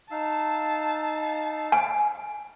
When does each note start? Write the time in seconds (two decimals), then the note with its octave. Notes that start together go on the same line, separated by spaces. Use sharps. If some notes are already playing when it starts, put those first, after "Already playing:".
0.11 D#4 F5 A5 E6
1.72 G#5